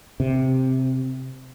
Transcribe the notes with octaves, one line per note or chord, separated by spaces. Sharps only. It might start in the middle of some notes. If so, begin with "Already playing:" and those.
C3